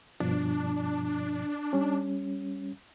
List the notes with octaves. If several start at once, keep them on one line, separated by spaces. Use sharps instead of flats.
G2 B2 F3 D4
G3 C#4